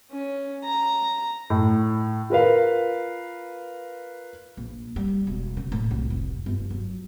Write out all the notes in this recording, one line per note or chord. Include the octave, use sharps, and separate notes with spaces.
C#4
A#5
A2
F4 A#4 B4 F5
A#1
G3
E1
C#3
A2
C2
F1
G1
F#3